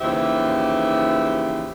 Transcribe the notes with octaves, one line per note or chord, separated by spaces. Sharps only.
D#2 C#3 E3 F3 G4 E5